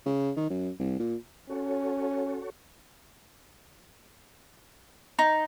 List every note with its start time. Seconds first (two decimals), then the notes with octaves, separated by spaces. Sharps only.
0.06 C#3
0.36 D#3
0.50 F#2
0.79 C2
0.99 A#2
1.49 C#4 F#4 A4 C#5
5.19 D#4